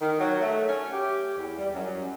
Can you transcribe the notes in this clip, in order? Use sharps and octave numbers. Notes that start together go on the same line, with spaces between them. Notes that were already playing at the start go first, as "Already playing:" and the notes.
D#3
F#3
A3
C#4
G4
E2
G3
F#2